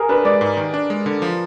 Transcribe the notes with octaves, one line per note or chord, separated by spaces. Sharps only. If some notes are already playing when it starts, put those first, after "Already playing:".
Already playing: G#4 A#4
D4 B4
G#3 D5
G#2
D#3
D4
G#3
D3
F3